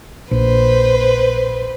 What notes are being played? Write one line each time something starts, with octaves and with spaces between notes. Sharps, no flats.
A#1 B4 C5